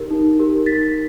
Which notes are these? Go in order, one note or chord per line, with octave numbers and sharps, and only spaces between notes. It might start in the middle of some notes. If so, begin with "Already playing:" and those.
Already playing: D#4 G4 A#4
D#4
G4 A#4
D#4 A6 B6